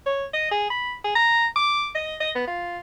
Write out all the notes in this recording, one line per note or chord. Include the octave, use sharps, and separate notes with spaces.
C#5
D#5
G#4
B5
G#4
A#5
D6
D#5
D#5
B3
F4